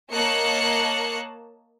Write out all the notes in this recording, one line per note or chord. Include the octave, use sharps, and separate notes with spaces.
A#3 C#5 D#5 A5 F#6 C#7